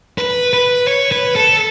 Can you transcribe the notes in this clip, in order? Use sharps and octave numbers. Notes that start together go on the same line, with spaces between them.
B4
B4
C#5
B4
A4